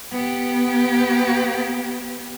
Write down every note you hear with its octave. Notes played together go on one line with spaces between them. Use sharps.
B3 G4